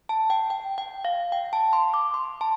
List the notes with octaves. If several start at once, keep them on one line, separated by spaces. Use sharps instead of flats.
A5
G5
G5
G5
F5
G5
A5
C6
D6
C6
A5